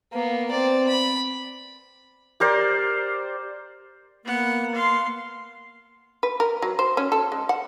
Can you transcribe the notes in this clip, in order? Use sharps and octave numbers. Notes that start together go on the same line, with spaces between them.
A#3 B3
C4 D5
B5
G4 A#4 C5 D5
A#3 B3 F#5
F5 C6
B4
A#4
F#3
C5
C#4
A4
G#3
F#5